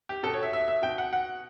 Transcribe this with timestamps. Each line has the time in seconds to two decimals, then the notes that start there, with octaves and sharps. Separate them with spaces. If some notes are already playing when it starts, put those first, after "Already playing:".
0.09 G4
0.23 B2 A4
0.34 C#5
0.43 E5
0.53 E5
0.68 E5
0.82 B2 G5
0.98 F#5
1.13 F#5